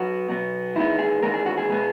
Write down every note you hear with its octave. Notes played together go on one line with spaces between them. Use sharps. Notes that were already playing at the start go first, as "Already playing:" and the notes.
Already playing: F#3 B3 F#4
B2 F#3 B3
E2 D#3 G#3 B3 E4
G#4
E2 D#3 G#3 B3 A#4
G#4
F#4
G#4
B2 G#3 B3